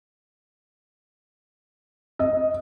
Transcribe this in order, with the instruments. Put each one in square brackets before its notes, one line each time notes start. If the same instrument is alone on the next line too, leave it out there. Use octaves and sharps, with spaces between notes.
[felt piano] D#5